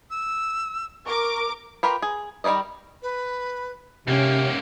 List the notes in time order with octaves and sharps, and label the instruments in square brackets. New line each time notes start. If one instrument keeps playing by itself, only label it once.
[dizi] E6
[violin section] A#4 D6 [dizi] C#6
[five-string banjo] F4 G4 A#4 B4
G#4
D#3 G3 B4 D5 D#5
[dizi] B4
[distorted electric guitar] G#2 A#3 [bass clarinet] C3 [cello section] C#4 [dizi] G5